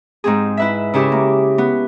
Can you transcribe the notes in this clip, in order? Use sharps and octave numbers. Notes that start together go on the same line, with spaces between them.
G#2 C4 G#4
E4 B4 E5
C#3 C#4 E4 G4
A#3
B3